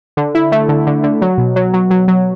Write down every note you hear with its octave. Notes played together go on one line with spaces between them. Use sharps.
D3
E4
A3
D3
D3
D3
F#3
B2
F#3
F#3
F#3
F#3